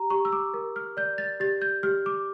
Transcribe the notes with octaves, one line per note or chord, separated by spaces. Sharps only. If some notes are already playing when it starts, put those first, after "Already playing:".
Already playing: G4 A#5
G4 C#6
E6
D6
A#4
F6
D5 G6
A6
G4 A6
G6
G4 F6
D6